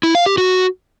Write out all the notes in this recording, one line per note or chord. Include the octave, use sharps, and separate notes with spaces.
E4
F5
G4
F#4